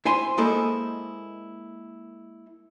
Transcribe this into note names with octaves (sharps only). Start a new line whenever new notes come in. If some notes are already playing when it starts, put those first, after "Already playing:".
E4 C5 G#5 C6
G#3 A#3 E4 A4 C5 D#5